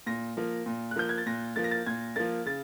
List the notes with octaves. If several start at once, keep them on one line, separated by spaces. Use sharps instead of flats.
A#2 A#6
F3 A#3
A#2
F#6
F3 A#3 G6
G#6
A6
A#2 A#6
F3 A#3 A6
A#6
A6
A#2 G#6
F3 A#3 A6
C#3 A6